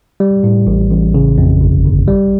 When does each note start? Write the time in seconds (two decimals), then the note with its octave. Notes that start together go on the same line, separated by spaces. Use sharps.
0.20 G3
0.44 A2
0.67 A1
0.91 A1
1.14 C#3
1.38 F2
1.61 G1
1.85 G1
2.08 G3